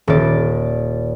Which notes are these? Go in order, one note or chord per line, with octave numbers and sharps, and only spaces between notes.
D#1 D5